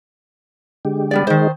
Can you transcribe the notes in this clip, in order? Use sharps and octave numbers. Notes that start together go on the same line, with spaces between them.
D3 G#3 G4
G3 B3 D5
D#3 G#3 D#4 C5